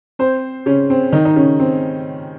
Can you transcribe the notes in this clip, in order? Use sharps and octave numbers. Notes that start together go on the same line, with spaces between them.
C4 C5
C#3 C#4
C4
D#3 D#4
D#4
C#3 C#4
C4